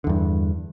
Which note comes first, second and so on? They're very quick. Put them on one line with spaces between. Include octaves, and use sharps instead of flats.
D3 E2 G2